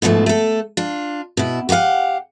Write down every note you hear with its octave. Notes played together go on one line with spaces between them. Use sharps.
G#2 B2 F3 G3 A3
A3 A4
D4 F4
B2 E4
F#4 G4 A4 F5 F#5